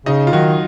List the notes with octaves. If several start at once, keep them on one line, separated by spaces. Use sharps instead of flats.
C#3 D#4 D#5
F4
D#3 F#3 F#4